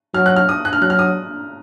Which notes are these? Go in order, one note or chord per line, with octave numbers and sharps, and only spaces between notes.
F#3 F6
F#6
F6
D#6
F#6
F6
F#3 F#6
F6
D#6